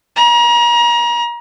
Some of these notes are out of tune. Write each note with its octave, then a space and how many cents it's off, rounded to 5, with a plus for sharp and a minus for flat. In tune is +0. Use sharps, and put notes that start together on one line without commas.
A#5 +35